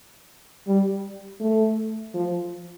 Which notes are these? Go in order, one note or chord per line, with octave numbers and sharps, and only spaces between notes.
G3
A3
F3